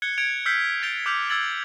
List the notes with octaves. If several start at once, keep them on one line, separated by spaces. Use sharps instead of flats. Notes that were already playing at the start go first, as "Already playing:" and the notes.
F#6 G#6 C#7 G7
G#6 C#7 D7 F7
E6 F6 G6 B6 C7 G7
G6 A6 D7 F7 G7
D6 E6 F6 G6 B6 F7
E6 G#6 A6 F#7